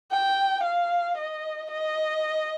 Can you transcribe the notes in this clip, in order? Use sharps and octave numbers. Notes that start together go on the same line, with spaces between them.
G5
F5
D#5
D#5